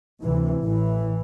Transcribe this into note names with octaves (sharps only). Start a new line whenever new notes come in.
D2 C3 E3
A1 A2 E3